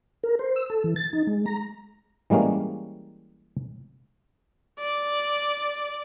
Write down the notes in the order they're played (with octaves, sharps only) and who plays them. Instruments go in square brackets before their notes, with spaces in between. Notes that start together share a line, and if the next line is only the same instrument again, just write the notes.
[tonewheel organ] A#4
C5
E6
A4
E3
A6
D#4
G#3
A#5
[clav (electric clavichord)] E3 G3 G#3 A#3 C#4
[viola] D5